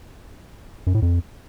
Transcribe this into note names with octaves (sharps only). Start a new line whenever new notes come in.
F#2
A2
F2